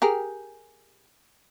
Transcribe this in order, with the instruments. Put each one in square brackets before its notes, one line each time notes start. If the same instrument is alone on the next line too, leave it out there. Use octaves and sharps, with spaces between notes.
[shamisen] G4 G#4 A#4